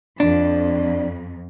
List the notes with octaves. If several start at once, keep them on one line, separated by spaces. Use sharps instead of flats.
F2 D4